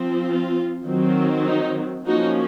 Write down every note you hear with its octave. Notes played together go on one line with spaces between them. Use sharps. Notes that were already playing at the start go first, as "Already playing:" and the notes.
Already playing: F3 C4
F4
D#3 F#3 C4
D#4
F3 A#3 C#4 D#4 F#4